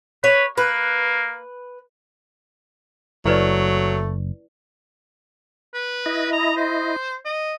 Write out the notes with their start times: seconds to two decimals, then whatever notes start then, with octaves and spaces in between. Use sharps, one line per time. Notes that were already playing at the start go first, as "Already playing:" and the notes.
0.24 B4 C#5
0.57 A#3 B4
3.25 F#1 F#3 A3 E4 B4 D5
5.74 B4
6.06 E4 D#5
6.32 A#5
6.57 C5
7.25 D#5